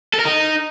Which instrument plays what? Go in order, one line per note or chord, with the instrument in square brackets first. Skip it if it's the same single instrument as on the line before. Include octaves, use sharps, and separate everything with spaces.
[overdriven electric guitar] A4
A#4
D#4